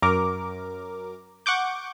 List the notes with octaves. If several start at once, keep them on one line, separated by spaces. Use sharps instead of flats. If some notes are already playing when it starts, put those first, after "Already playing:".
F#2 A#4 D6
F#5 C#6 D6 G6